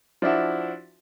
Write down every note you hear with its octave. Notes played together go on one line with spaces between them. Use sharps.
F3 D4 E4 F#4